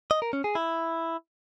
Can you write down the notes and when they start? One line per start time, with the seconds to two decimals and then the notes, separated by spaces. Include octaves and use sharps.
0.11 D#5
0.22 A#4
0.33 C#4
0.44 G#4
0.55 E4